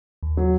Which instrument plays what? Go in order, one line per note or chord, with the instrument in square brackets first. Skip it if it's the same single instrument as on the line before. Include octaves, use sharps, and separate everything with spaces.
[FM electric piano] D#2
[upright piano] F#3